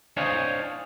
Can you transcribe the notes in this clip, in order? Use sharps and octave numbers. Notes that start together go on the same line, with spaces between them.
D4 C5 C#5 D#5 F5